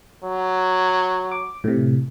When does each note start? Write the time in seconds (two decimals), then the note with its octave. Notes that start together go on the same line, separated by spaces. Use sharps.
0.24 F#3
1.32 D6
1.64 A2 C3